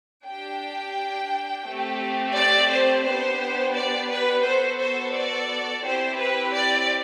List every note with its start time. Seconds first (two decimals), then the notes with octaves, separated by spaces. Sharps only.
0.25 D4 G4 G5
1.65 A3 C4 G4
2.35 D5
2.70 C5
3.05 B3 D4 G4 C5
3.75 D5
4.10 B4
4.44 B3 F#4 A4 C5
4.79 C5
5.15 D5
5.85 C4 E4 G4 C5
6.19 B4
6.55 D5